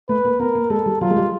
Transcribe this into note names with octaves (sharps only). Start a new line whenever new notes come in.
A3 B4
A#3
B3 A#4
A#3
G#3 A4
G3
F#3 F4
G#3
G3